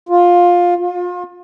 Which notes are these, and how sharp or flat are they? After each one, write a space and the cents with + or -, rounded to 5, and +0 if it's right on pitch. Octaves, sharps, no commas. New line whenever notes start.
F4 +15
F4 +35